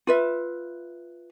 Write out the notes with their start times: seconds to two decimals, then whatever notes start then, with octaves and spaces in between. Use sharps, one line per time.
0.07 F4 B4 E5